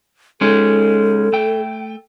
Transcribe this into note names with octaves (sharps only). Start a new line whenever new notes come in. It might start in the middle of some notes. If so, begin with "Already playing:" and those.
G#3 C#4 D#4 A4
A3 G5